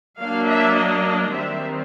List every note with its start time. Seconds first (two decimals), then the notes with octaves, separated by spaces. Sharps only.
0.20 F#3 A#3 D4 F5
0.49 E5
0.77 D#5
1.34 D#3 G3 C4 E5